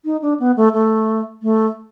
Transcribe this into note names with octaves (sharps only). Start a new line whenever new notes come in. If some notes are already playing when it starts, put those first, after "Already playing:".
D#4
D4
B3
A3
A3
A3